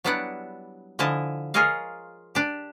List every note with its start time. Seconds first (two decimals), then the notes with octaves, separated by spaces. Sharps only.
0.04 F#3 G3 B3 D4 E4 F#5
0.99 D3 F3 E4 D#5 G#5 A5
1.54 F4 G#4 A#4 C#5 D#5 F5
2.35 D4 G4